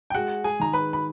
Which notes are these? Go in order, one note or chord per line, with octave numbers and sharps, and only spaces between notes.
G5
G#3 F#4 F#5
G#4 G#5
D#3 A#5
B4 B5
B5